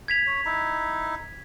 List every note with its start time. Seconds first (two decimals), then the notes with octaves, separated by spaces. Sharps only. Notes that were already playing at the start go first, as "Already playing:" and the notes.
0.08 G#6 B6 F7
0.27 C#5
0.45 D#4 E4